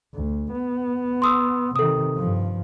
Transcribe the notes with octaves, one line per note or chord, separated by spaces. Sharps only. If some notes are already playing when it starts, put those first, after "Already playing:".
D2
B3
C6 D#6 E6
C3 D#3 A4 D#6
G2 F3